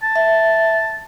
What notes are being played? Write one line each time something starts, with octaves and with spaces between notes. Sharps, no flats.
A5
E5